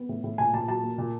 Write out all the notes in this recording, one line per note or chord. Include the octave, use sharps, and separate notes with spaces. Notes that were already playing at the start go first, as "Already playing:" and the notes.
Already playing: B3
A2
A2
A#2 G#5
A#2 A5
F#3 A5
A#3
A#2